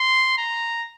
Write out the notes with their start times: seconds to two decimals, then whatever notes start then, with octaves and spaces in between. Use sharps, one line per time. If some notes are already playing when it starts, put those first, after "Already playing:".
Already playing: C6
0.38 A#5